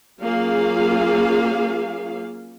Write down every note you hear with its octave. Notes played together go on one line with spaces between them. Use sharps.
F#3 A#3 C#4 F4 G#4 F5